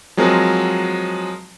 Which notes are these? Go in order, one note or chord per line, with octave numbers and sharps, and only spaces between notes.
F3 F#3 G#3 C4 A#4